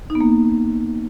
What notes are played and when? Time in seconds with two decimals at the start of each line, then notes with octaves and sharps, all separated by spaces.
0.10 D#4
0.15 B3
0.21 A#3